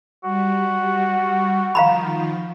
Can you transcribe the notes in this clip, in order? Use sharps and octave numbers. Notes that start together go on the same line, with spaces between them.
G3 F#4
D#3 F3 F5 A#5 B5